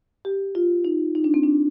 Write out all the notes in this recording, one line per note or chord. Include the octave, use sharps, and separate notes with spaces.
G4
F4
D#4
D#4
D4
C4
D4